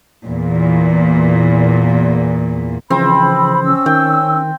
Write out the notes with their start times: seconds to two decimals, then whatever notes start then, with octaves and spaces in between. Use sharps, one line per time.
0.25 E2 A#2
2.90 C#3 E3 F3 C4 B5
3.62 C#4 E6
3.86 D#3 G5